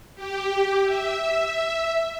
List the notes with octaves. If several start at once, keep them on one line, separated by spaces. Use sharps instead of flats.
G4
E5